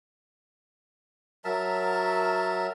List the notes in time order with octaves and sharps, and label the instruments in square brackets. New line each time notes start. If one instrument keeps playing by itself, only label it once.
[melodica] F#3 A#4 E5 A5